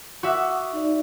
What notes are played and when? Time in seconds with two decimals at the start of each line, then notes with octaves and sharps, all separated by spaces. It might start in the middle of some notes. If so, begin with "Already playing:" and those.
0.23 F#4 E5 F#5 D6 D#6
0.73 D#4 D5